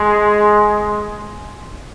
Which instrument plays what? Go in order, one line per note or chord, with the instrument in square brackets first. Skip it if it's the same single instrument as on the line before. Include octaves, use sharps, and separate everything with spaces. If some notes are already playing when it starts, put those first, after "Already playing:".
Already playing: [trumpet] G#3